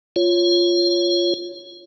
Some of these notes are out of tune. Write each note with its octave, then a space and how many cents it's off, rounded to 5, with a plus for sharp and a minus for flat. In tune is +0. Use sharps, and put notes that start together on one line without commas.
F4 +0 C#5 +0